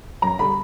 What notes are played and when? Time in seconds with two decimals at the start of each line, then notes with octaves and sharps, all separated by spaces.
0.22 F#2 A#5
0.39 D3 G3 B5